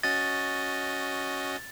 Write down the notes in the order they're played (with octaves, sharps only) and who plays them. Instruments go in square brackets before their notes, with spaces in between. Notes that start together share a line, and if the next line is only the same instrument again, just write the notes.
[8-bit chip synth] C#4 F#4 D#5 [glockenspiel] A6